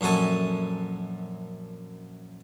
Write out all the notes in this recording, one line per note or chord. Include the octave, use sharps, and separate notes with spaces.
A#1 F#2 F#4 A4 G#5